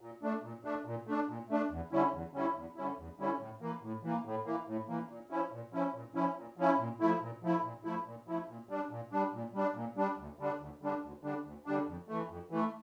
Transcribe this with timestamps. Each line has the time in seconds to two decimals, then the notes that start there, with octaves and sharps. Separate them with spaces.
0.01 A#2
0.23 A3 D4
0.43 A#2
0.65 A3 D4
0.85 A#2
1.07 A3 D4
1.28 A#2
1.50 A3 D4
1.71 E2
1.92 D3 G3 C#4 E4
2.13 E2
2.34 D3 G3 C#4 E4
2.56 E2
2.76 D3 G3 C#4 E4
2.98 E2
3.19 D3 G3 C#4 E4
3.40 A2
3.61 E3 A#3
3.83 A2
4.03 E3 A#3
4.25 A2
4.46 E3 A#3
4.67 A2
4.89 E3 A#3
5.09 A#2
5.30 F3 C#4 E4
5.52 A#2
5.73 F3 C#4 E4
5.94 A#2
6.15 F3 C#4 E4
6.36 A#2
6.57 F3 C#4 E4
6.79 A#2
7.00 F3 A3 E4
7.21 A#2
7.43 F3 A3 E4
7.63 A#2
7.84 F3 A3 E4
8.05 A#2
8.27 F3 A3 E4
8.48 A#2
8.69 G3 D4
8.91 A#2
9.12 G3 D4
9.33 A#2
9.54 G3 D4
9.75 A#2
9.97 G3 D4
10.18 D2
10.39 D3 G3 D4
10.59 D2
10.82 D3 G3 D4
11.02 D2
11.23 D3 G3 D4
11.44 D2
11.66 D3 G3 D4
11.87 F2
12.08 E3 A3
12.29 F2
12.51 E3 A3